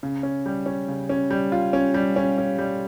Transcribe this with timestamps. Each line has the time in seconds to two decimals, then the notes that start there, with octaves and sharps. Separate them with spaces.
0.03 C#3
0.23 C#4
0.46 G3
0.66 C#4
0.88 C#3
1.09 C#4
1.30 G3
1.52 F4
1.73 C#4
1.94 G3
2.16 C#4
2.38 C#4
2.58 G3